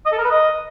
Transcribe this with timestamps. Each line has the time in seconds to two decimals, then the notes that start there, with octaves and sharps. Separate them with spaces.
0.06 D#5
0.12 A4
0.18 A#4
0.24 B4
0.31 D#5